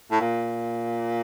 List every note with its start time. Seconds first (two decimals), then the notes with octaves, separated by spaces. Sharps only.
0.11 A2
0.20 A#2